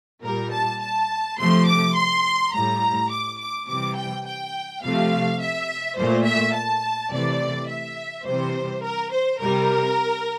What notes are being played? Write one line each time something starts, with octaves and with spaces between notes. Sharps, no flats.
A#2 G3 A#4
A5
A5
C3 F3 A3 C6
D6
C6
A2 G3 A#5
D6
D6
C3 E3 G3 D6
G5
G5
C3 F3 A3 F5
E5
A#2 A3 C5
E5
A5
C3 E3 A3 D5
E5
C3 E3 G3 C5
A#4
C5
C3 G3 A#4